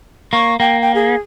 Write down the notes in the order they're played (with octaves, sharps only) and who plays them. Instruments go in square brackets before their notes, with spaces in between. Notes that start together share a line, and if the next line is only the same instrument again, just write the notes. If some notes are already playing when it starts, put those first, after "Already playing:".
[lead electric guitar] A#3 [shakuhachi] C#6
[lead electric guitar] A#3 [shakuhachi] G5
[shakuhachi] G5
G#4